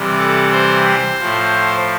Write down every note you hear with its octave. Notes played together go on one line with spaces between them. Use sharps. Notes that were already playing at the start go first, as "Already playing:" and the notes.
Already playing: C3 E3 G3
A4
C5
A2 F3